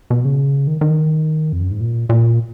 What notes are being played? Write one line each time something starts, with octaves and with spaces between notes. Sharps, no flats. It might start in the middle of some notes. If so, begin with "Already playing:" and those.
B2
C#3
D#3
D#3
F2
F#2
G#2
A#2
A#2